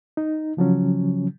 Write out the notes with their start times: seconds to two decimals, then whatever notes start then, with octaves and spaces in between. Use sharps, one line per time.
0.17 D#4
0.57 C#3 F3 F#3 C#4